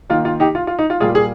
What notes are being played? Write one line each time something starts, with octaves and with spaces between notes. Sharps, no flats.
D#3 A#3 F4
F4
D#4 G4
F4
F4
D#4
F4
A#2 G3 A#3 F4 G#4
G#4